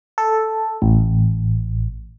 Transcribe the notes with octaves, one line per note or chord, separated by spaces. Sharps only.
A4
A1